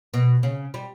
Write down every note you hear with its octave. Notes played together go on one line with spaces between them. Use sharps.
B2
C#3
G3